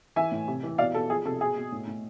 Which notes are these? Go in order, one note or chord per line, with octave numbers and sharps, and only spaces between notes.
E3 E5 G#5
A2
C3
E3
B2 D5 F5
B2 A4
F3 G#4
C3 A4
B2 G#4
B2
A2
A2